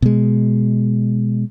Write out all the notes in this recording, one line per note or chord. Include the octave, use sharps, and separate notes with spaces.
B2 G#3